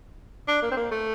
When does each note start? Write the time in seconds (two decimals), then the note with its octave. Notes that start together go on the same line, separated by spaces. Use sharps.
0.48 D4
0.62 A#3
0.71 C4
0.77 A#3
0.91 A3